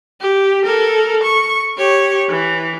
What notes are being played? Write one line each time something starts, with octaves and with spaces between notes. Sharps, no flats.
G4
A4 A#4
C#6
G4 C#5
E3